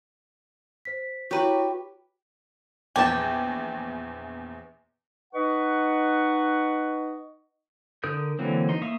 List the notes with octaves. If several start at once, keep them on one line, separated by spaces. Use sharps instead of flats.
C5 B6
E4 F#4 G4 B4 C#5 A#5 C#6
A#1 E2 G4 G#5 A5
D#4 B4 D#5 F#5 C#6
D3 A#4 D#6 G6
D3 E3 F#3 A#3 C4
D#4 C6
A#3 E5 F5 C#6 D#6